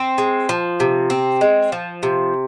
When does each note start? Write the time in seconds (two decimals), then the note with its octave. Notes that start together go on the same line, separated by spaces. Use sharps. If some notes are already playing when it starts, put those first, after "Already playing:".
Already playing: C4
0.18 G#3
0.49 F3
0.80 C3
1.10 C4
1.41 G#3
1.72 F3
2.03 C3